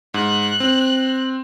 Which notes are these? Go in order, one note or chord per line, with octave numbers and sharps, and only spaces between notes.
G#2 F#6
C4